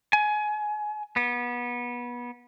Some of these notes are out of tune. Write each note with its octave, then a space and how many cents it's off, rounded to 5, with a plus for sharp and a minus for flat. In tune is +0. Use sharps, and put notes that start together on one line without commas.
G#5 +25
B3 -25